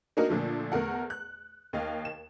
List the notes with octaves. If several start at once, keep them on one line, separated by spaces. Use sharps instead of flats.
A#3 D4 D#4 F#4 A#4
A#2 D3 F3 A3
E2 A3 A#4 F#5
F#6
D#2 D#5 F5
E7